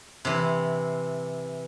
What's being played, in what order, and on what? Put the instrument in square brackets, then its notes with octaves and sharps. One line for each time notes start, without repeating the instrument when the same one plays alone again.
[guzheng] C3 E3